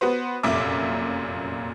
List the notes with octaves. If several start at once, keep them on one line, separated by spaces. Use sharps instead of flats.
B3 F#4 B4 C5
F1 F#2 A#2 E5 D6